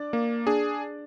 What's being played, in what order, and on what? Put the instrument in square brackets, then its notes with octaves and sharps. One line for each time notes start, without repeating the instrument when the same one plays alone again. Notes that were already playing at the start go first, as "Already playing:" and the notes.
Already playing: [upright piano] D4 D5
[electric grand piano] A#3
D4 G#4